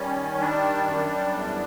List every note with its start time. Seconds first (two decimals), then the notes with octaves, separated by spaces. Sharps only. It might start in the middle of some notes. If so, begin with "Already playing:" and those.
Already playing: D#3 G3 C#4
0.40 G3 D4
0.86 F#2
1.32 E2